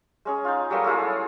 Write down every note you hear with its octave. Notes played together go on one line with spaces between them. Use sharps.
G#3 C#4 G#4
D#4 F4
F#3 G3 A3 A#3
A3 E4 F4 G#4